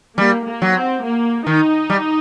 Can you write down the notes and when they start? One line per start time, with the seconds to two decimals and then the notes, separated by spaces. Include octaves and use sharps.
0.18 G3 A#3
0.46 A#3
0.62 F#3
0.76 C4
1.03 A#3
1.46 D#3 D#4
1.90 G3